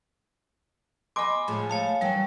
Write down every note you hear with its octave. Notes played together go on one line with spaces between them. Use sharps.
D#5 G#5 B5 C6 D6
A2 F3 G#3
C#5 F5 G#5 A5
F#2 E3 F#3 G3